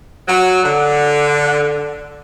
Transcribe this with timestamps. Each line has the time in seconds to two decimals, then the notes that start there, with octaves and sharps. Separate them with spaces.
0.28 F#3
0.63 D3